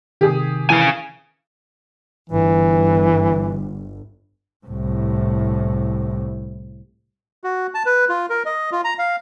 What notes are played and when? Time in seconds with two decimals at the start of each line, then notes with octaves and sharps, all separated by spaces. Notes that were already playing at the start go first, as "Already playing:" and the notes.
0.21 C3 D#3 G4 G#4 D#6
0.70 C#3 E3 G#5 C7
2.30 G1 E3
4.66 C2 A2
7.44 F#4
7.74 A5
7.86 B4
8.09 F4
8.30 A#4
8.46 D#5
8.72 F4
8.84 A#5
8.99 F5